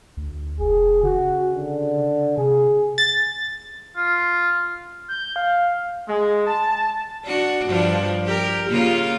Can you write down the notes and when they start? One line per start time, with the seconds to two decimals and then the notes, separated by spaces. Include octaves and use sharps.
0.17 D2
0.60 F1 G#4
1.03 C#3 F#4
1.53 D3
2.37 C3 G#4
2.98 A6
3.97 F4
5.08 G6
5.36 F5
6.09 G#3
6.46 A5
7.25 D4 F#4
7.67 G2 F3 D4
8.26 G4 A#4
8.69 C#3 A#3 F4